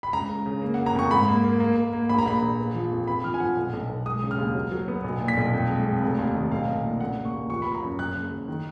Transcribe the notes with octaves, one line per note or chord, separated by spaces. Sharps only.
B5
C#2 A#5
C#2
C#3
A#3
A#3 F#5
A#5
F2 C#6
G#2 B5
A#3
A#3
A#3
A#3
A#3
A#1 B5
A#5
A#1 B5
A#1
B3
F3
F2
B3 B5
F3 F6
G#5
F3 F#5
B1
B1
B1
G#3 D#6
C#3
F6
D#2
F#3
F#3
B3
B1
A#2
B6
B1
F2
G#3
F2
F1
D#2
D#3
B1 F5
B1
A#2
C#3 F#5
A#3
C#6
D#2
F3 C#6
B3 B5
A#5
F#2
F#2 F#6
F#1
F#2
D#3